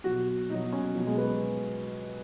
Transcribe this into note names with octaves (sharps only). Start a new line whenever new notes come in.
B2 F#3 F#4
B2 F#3 D#4
C#4
B2 F#3
G#3
B3